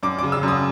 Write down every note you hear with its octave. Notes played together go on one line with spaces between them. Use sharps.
F#2 D6
C#3 D6
E6
F#2
D#6